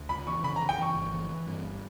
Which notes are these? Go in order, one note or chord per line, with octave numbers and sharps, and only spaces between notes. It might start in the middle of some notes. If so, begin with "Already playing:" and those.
Already playing: D2
C#3 B5
E3 C#6
C#3 B5
A#5
C#3
G5
E3 C#6
G1
E3
E3
G2
G1